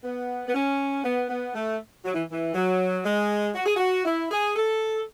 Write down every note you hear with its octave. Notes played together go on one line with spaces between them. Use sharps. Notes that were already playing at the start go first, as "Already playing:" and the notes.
B3
B3
C#4
B3
B3
A3
F#3
E3
E3
F#3
G#3
F#4
G#4
F#4
E4
G#4
A4